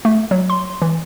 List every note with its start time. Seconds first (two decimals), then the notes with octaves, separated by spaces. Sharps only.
0.05 A3
0.31 F#3
0.50 C6
0.82 E3